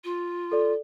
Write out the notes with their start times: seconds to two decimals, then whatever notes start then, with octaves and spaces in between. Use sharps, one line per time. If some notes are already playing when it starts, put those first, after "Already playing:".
0.04 F4
0.52 A4 D5